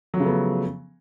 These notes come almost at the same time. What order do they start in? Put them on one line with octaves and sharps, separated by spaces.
F#3 F3 C#3 A3 B3